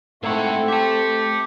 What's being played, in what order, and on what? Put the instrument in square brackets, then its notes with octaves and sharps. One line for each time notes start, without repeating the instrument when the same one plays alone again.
[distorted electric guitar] G#2 F#5 [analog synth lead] A3 [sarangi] C4 [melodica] E4
[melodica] G4 [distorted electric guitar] E5 A5